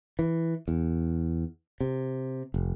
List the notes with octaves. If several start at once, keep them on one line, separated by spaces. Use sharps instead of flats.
E3
E2
C3
F1